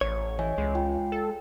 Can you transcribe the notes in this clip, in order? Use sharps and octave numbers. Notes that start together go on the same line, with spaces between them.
A1 C#5
E3 C#5 D#5 G#5
C#2 G#3
F4 G5
A4